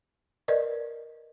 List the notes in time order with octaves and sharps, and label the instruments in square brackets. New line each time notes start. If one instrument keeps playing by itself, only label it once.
[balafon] A#4 B4 D5 D#5